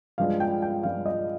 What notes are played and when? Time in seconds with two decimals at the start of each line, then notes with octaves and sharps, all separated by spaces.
0.18 G2 F3 G#3 D4 F5
0.40 G5
0.62 G5
0.83 G2 F3 G#3 D4 F5
1.06 D#5